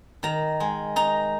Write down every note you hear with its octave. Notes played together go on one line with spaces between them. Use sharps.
D#3 A#5
G#3
D#4 A#5